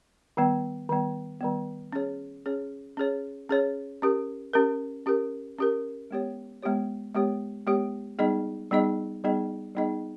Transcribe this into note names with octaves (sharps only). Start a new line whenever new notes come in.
D#3 G3 B3
D#3 G3 B3
D#3 G3 B3
C#4 G#4 C#5
C#4 G#4 C#5
C#4 G#4 C#5
C#4 G#4 C#5
C#4 G4 A#4
C#4 G4 A#4
C#4 G4 A#4
C#4 G4 A#4
G#3 B3 G4 C#5
G#3 B3 G4 C#5
G#3 B3 G4 C#5
G#3 B3 G4 C#5
G3 B3 D#4 G#4 D#5
G3 B3 D#4 G#4 D#5
G3 B3 D#4 G#4 D#5
G3 B3 D#4 G#4 D#5